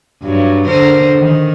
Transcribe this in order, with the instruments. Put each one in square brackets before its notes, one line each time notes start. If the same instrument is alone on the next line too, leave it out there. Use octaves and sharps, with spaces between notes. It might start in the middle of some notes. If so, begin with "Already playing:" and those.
[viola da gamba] G2 F#3
D3 A#4 C5
D#3